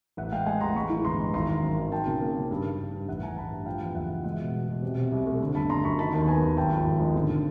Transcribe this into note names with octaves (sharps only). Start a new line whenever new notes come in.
A1 E5 F#5
G#3 F5 G5
G#3 F#5 G#5
A1 A#5 C6
G#3 B5 C#6
E3
G1 A#5 C6
G#3
G#1 A#5 C6
G#1
F#2
D#3
F#3 G5 A5
C#3
A#3
C#3
G2
G2
G2
G2
A1 E5 F#5
A1 G#5 A#5
A1 A5 B5
G2
F3 F5 G5
E2
F#1 E5 F#5
E2
G#3 E5 F#5
B2
B2
B2
C3
C3
C2
A3
D3
G1 A5 B5
D3 A#5 C6
F#2 B5 C#6
D#3 A5 B5
D#2
B3 G#5 A#5
D#2
G#1 G5 A5
F3
G#1
G#2
D3
D3